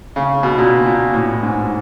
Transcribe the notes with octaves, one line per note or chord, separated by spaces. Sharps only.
C#3
B2
A#2
A#2
A2
G#2